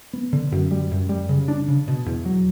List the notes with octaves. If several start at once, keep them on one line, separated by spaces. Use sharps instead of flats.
B3
D3
F#2
G3
F#2
G3
C#3
D4
C#3
B2
E2
F#3